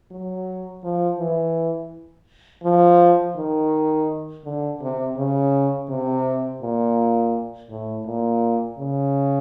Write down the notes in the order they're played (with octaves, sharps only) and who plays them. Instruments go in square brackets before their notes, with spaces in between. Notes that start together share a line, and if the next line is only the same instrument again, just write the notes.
[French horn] F#3
F3
E3
F3
D#3
D3
C3
C#3
C3
A#2
A2
A#2
C#3